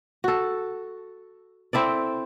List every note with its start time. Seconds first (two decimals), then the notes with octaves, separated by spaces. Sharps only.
0.24 F#4 A4
1.73 C4 E4 A4 D5